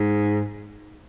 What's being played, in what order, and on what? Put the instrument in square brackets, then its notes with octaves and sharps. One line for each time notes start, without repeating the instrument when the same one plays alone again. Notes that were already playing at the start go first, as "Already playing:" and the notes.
Already playing: [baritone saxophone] G#2